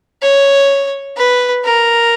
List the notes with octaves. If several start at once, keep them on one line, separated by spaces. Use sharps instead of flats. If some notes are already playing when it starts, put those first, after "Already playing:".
C#5
B4
A#4